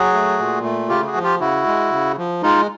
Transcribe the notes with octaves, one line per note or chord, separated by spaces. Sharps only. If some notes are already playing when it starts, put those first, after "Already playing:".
Already playing: F#3 F#4 G#4
A3
A#2
A3
C#3 F4 G4
F#4 G#4
F3
F4 G4
C#3 E4 F#4
G#3
C#3
F3
G#3 D#4 F4